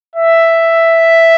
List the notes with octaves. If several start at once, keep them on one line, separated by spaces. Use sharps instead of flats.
E5